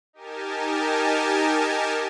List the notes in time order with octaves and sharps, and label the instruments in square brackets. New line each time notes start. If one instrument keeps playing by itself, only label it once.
[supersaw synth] D#4 G4 A#4 G#5 A5